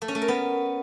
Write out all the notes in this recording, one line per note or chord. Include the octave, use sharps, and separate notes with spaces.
A3
C#4
A3
A#4
B3